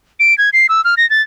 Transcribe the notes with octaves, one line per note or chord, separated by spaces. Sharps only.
D7
G#6
C7
E6
F6
A#6
A6